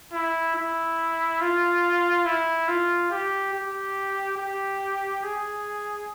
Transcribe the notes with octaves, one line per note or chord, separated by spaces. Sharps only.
E4
E4
F4
E4
F4
G4
G4
G4
G#4